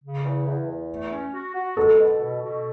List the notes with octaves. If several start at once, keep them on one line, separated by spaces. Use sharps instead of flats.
C#3
E2
E2
E2
A3
C#4
F#4
F#4
G#3 A4
B2
B2
B2